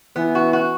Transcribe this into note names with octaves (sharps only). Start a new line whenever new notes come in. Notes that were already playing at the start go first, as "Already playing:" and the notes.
E3 B3
F#4
F#4